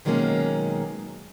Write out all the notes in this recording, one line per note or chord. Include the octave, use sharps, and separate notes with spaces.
B2 D#3 F#3 G#3 A#3 C#4